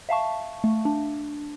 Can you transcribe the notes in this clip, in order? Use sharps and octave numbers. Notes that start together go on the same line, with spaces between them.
E5 F5 A5 C#6
A3
D4